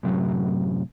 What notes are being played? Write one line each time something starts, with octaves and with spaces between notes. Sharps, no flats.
F#2 A2 C3 F#3